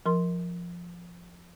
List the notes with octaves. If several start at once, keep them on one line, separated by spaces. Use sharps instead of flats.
F3 A#4 C6